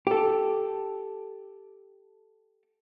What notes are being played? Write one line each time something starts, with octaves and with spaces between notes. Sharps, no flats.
G4 A4